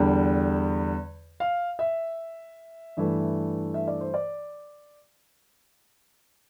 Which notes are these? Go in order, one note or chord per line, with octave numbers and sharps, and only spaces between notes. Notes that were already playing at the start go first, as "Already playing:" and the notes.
Already playing: E2 D3 G3
F5
E5
G2 E3 A3
E5
D5
C5
D5